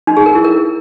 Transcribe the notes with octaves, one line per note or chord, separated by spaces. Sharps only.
D#4
G#4
A#4
E4
A#4